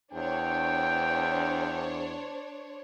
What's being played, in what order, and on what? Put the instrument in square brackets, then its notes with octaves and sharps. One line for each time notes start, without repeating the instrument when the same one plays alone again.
[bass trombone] E2 [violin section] D4 C5 C#5 [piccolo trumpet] G5